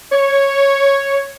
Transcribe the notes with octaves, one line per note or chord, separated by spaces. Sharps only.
C#5